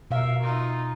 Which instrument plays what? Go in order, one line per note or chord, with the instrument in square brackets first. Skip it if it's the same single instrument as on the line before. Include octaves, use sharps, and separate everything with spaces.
[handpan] B2 F5 [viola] A#4 E5
[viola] D#4 F4